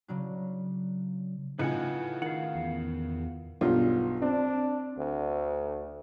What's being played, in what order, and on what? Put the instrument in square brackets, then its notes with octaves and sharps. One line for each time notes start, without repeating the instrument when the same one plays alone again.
[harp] C#3 F#3 D4
[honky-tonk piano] A2 C#3 F3 [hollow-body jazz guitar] D#4 [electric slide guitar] B4 F#5 G#5
[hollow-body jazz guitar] D#3 [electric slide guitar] F5 F#5
[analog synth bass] E2
[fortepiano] B1 G2 F4
[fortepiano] C4 [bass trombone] D4
[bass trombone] D2